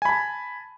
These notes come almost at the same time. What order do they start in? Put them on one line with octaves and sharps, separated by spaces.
G#5 B5 A5